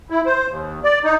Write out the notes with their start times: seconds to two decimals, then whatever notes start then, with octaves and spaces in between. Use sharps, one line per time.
0.10 E4
0.26 C5
0.48 D#2
0.84 D5
1.05 D#4